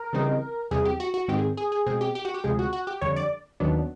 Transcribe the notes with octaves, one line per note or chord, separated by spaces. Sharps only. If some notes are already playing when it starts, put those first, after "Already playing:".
Already playing: A#4
C#3 E3 G3 C4 D#4
E2 C3 E3 G3 G#4
G4
F#4
F#4
G#2 D#3 G#3 C4 G4
G#4
G#4
G#4
B2 G#3 C4 G#4
G4
G4
F#4
G4
D2 C3 F3 G#3 G#4
F#4
F#4
G4
F2 D3 G3 C#5
D5
D#2 D#3 F#3 B3 D4